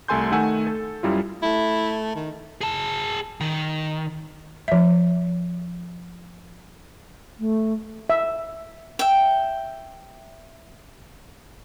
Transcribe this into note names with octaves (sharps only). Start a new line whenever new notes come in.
C2 A3 A4 G#5 C6 G6
D#3 A3 F#5 G#5 E6
A4
F#2 G3 E4 F4
A3 E4
D#3
G#4 A5
D#3
F3 E5
A3
E5
E5 G5